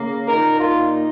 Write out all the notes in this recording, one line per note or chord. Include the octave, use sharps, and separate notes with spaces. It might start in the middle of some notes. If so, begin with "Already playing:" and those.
Already playing: C#3 A#3
A#2 A#3 D#4 A#4
F4